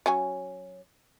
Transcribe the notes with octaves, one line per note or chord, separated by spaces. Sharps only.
F#3 C#4 G#5